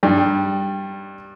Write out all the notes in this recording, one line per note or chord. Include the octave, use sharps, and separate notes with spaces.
G2 G3